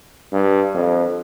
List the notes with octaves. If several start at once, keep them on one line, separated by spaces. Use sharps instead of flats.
G2
F2